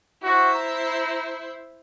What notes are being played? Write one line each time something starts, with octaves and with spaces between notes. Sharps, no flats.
E4 F#4 C5
A#5